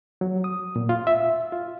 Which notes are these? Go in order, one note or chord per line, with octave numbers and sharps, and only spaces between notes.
F#3
D#6
A#2
F4
E5
F4